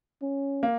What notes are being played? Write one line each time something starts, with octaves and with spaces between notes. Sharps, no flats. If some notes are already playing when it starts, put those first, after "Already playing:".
C#4
A#3